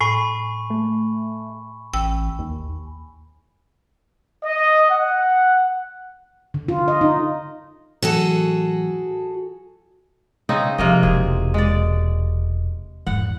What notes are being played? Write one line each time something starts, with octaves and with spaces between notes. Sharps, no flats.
A2 G#5 B5 C#6
A3
A1 G5 E6
D#2
D#5
F#5
D3
F4
D#5
D#4
A2 E3 F#3 F#4 G#4 A4
C#3 C4 D#4
C3 F3 A#3 D#5
E1 E2 G#4
G#3 D5
E2 G#2 F#5